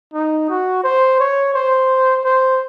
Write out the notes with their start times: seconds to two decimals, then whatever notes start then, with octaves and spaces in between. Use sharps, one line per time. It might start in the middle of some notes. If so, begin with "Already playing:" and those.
0.14 D#4
0.49 F#4
0.84 C5
1.20 C#5
1.54 C5
2.24 C5